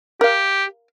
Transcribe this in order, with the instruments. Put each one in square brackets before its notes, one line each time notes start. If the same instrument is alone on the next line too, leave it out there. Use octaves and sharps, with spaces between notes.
[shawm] G4 [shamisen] A#4 F5